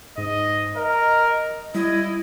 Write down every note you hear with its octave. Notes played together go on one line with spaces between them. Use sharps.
G#2 D#5
A#4 D#5
G3 E4 D#5